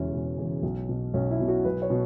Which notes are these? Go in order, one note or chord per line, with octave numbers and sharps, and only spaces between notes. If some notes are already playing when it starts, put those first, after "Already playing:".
Already playing: E1 E2 C#3 C#4 E4
E1
E2 C#3
B1
B2
B1 C#4
E4
B2
F#4
B1 B4
C#5
B2